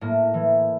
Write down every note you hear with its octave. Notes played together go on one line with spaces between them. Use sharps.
A2 A#3
E3